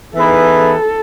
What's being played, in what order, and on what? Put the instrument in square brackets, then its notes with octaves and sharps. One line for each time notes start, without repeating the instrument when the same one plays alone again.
[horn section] E3 B3 D#4 G#4 B4 [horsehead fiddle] A4